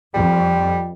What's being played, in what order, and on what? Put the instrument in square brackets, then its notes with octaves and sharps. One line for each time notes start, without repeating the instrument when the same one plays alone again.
[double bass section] F2 [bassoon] G3